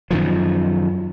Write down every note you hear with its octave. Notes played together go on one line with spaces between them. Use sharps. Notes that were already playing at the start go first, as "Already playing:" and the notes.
F#2 D#3 F3